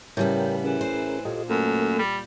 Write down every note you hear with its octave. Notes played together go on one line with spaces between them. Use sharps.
A2 C#3 G3 B3 A#4 G5
E3 C#4 G#4 A#4
C5
A#2 G4 A4 D#5
F#2 A3 A#3 A4
G3